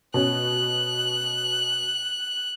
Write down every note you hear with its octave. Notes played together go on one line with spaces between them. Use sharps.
B2 C#4 F#6